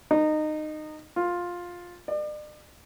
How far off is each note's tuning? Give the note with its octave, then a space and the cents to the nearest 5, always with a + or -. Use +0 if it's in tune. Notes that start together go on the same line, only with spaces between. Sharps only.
D#4 -20
F4 +10
D5 +40